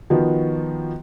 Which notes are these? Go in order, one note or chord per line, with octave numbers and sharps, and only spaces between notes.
D#3 F3 B3 F#4